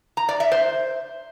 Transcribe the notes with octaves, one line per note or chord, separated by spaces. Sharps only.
A#5
D5
E5
C5